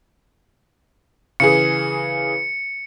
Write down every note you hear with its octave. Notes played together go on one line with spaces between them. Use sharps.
C#3 E3 G#4 C#7